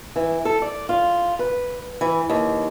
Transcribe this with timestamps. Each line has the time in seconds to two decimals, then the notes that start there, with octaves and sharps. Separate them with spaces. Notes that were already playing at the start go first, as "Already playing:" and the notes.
0.16 E3
0.45 A4
0.62 D5
0.89 F4
1.39 B4
2.01 E3
2.30 D#2